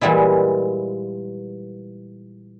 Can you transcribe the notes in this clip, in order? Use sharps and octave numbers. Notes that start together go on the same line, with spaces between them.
A#2 E3 G3 G#3 E4